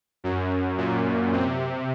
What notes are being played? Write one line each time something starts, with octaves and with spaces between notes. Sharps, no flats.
F#2
A#2
C3